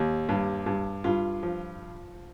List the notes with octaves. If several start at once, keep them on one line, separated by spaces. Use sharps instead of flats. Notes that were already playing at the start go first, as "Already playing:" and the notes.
Already playing: D#2
G2
G2
G2 F4
F3